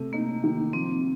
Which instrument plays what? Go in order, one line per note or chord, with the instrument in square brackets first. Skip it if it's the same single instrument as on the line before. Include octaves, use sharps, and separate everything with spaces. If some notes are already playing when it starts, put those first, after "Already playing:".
Already playing: [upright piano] C3 A3
[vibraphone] A#3 [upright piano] D#4
[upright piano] D#3
[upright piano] F3 [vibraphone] C4